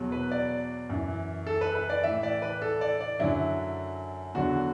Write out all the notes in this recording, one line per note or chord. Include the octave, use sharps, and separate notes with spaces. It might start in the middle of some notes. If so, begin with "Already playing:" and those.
Already playing: E2 B2 F#3
B4
D5
F#2 E3
A4
B4
B4
D5
A2 E3 E5
D5
B4
A4
D5
D5
F#2 D3 F#3 E4
E2 D3 F#3 F#4